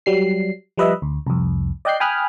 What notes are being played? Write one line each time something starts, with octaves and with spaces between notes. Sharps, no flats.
F#3 G3 C7
F3 G3 B4 D#5 E5
D2
C2 F2
D5 D#5 G5 F#6 G6 C7
G5 G#5 B5 D#6 F6 F#6